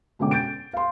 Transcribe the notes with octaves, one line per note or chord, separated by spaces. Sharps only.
B2 D3 G#3 C#4 G5 D6
G6 A6 D7
F5 C6